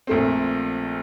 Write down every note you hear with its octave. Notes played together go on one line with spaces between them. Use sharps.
A#1 A#2 A3 C4